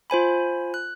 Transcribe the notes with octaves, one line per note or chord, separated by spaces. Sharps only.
F4 C5 G#5 B5
F#6